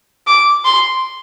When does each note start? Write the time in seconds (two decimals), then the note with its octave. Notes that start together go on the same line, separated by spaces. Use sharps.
0.27 D6
0.65 C6